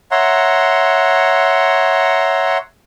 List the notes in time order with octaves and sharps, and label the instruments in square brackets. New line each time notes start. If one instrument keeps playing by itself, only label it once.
[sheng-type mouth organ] C#5 E5 F#5 A#5 C6